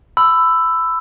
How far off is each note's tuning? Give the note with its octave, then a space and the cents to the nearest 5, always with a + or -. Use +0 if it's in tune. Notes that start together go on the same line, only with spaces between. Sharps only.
B5 +25 E6 +5